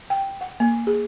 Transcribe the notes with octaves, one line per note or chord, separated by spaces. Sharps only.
G5
F#5
A#3
G#4